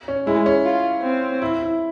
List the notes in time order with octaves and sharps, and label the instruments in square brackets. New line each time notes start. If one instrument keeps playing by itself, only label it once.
[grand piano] C#4
[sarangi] G#3 [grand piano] E4
[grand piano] C#4
[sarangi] F4
C4
[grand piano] E4
E4